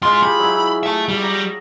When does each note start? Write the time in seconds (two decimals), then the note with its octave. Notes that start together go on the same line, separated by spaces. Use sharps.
0.02 G#2 G#3 F4 C6
0.23 G4 G#4 B5
0.40 F#3 E4
0.83 E5 A5
1.08 G3
1.23 A#5